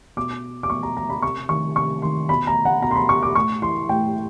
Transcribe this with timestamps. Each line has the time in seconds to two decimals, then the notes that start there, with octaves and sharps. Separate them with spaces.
0.17 B2 D6
0.63 D6
0.70 B2 C#6
0.83 A#5
0.97 A#5
1.10 B5
1.22 C3 C#6
1.49 D#3 C#6
1.76 C3 C#6
2.02 D#3 C6
2.29 B2 B5
2.47 A#5
2.65 F#5
2.82 B2 A#5
2.91 C6
2.95 B5
3.09 C#6
3.23 D6
3.35 A2 C#6
3.62 E3 C6
3.89 A2 G5